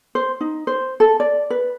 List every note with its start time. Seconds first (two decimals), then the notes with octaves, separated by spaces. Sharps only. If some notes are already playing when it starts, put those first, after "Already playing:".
0.15 C5
0.41 D#4
0.67 C5
1.00 A4
1.20 D5
1.50 B4